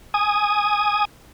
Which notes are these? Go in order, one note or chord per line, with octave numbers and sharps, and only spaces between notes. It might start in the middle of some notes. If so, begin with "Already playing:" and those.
G#5 D#6